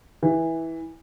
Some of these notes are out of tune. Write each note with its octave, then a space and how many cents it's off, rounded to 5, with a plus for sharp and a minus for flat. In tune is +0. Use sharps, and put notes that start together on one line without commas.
E3 -10